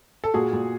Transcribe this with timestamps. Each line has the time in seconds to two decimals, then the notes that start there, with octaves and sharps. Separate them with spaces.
0.24 A4
0.34 A#2 F#4 G#4
0.53 A#2